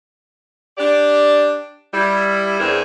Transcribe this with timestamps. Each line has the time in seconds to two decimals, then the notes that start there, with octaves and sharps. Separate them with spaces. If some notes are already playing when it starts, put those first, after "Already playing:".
0.78 D4 G4 D5
1.94 G3 E4
2.59 E2 C4 D4 E4 G#4 A#4